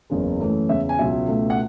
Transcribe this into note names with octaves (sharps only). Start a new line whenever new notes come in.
F#1 E2 C#3 G#3
F#2 E3 A3
E2 C#3 G#3 E5
G#5
C#2 B2 F#3 E5
C#2 B2 A3
F#5